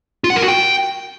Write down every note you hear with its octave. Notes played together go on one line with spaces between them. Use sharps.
F4
F#5
A#4
F#4
G5